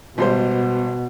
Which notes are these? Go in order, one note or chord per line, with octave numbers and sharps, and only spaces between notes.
G#1 B2 G3 C5